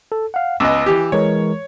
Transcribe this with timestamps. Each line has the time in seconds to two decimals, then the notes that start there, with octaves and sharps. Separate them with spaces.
0.12 A4
0.34 F5 F#5
0.60 C#2 B3 D#5 E6
0.86 E3 G4
1.12 E3 G#3 A#4 C#5